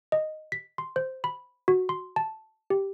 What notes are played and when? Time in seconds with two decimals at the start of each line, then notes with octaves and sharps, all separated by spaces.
0.12 D#5
0.52 B6
0.78 C6
0.96 C5
1.24 B5
1.68 F#4
1.89 C6
2.16 A5
2.70 G4